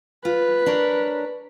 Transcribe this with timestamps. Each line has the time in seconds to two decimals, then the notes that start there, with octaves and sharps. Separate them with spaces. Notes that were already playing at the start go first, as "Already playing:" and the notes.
0.25 F4 B4
0.66 D4 A#4 C#5